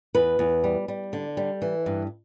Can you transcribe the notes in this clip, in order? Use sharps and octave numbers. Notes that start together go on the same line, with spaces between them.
E2 B4
E2
G3
G3
D3
G3
E3
G2